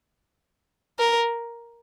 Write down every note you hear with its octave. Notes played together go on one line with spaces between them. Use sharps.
A#4